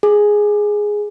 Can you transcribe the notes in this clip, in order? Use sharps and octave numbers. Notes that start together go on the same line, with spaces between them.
G#4